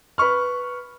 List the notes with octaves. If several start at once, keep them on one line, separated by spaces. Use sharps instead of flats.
B4 B5 C#6 F6